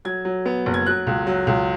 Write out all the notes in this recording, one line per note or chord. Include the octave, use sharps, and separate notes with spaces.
F#3 G#6
F#3
B3
F#1
G#6
F#3 F#6
C#2
F#3
C#2